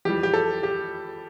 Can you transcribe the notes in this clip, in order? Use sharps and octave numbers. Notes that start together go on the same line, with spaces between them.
F2 E3 G3 G4
G4
A4
G4